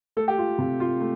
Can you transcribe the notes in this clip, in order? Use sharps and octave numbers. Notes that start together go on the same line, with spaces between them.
A3 A4
G4
F4
C3 F4
F4
A3